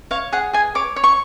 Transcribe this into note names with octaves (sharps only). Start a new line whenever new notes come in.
C#5 F5
G#4 F#5
G#4 G#5
C#5 D6
C#5
C#6